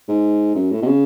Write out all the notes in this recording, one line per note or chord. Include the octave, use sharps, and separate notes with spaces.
G#2
F#2
A2
B2
C#3